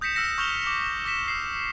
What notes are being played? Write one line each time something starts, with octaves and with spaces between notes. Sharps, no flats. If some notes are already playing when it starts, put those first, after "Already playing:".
D#6 G6 A#6 B6 C#7 E7
E6 F6 A#6 C#7 E7
C#6 F6 G6 E7 F7 G7
D6
D6 A#6 B6 E7 G7
E6 C7 E7